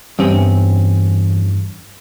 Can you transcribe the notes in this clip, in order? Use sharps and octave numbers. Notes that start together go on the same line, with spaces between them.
E2 G2 C4 C#4